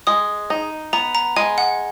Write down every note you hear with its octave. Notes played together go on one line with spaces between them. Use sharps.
G#3 D#6
D#4
B3 A#5
A#5
G#3 G#5
F#5